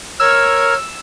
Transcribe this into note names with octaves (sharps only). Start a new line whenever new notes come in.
A#4 C#5 E6 F6 G#6